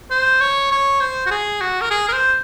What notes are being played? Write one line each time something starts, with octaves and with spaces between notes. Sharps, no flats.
C5
C#5
C#5
C5
F#4
G#4
F#4
A#4
G#4
A#4
C5